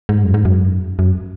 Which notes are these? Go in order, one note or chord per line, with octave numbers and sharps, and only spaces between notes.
G#2
F#2
G#2
F#2
F#2